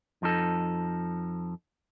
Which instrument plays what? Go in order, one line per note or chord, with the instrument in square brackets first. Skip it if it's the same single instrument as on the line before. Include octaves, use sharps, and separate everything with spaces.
[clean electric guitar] F2 F3 D#4 A4